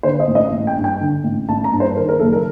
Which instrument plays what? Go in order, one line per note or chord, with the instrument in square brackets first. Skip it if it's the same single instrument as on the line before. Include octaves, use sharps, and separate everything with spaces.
[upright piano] D3 C5
D#5
A1
D#5
A1
G5
G2
G5
D3
A1
A1 A5
A#5
G2
C5
D#3 A#4
A#4
F#1 A4
A#4